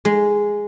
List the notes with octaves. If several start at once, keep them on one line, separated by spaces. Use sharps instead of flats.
G#3